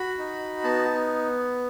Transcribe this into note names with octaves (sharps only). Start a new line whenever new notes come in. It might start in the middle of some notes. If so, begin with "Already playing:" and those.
Already playing: F#4 B5
D#4
B3 A5